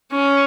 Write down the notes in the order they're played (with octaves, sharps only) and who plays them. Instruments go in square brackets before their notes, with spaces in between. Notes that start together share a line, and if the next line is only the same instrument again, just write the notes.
[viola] C#4